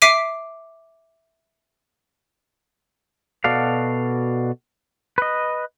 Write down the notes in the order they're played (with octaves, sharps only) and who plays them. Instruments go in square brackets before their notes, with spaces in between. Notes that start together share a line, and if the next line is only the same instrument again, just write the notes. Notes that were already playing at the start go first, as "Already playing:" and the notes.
[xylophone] E5 D6 B6 C7 D7 D#7
[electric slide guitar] B2 F#4 A4 D5 F5
B4 D#5